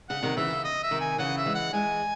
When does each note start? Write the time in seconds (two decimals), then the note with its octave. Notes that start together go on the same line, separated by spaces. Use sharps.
0.09 C#3 F#5
0.23 C3 D#3
0.37 C#3 E3 E5
0.51 C#3
0.64 D#5
0.83 E5
0.91 C3 D#3
1.01 G#5
1.18 C#3 E3 F#5
1.37 E5
1.46 E3 G#3
1.55 F#5
1.73 E3 G#3 G#5